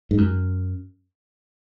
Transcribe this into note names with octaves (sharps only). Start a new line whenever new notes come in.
G#2
F#2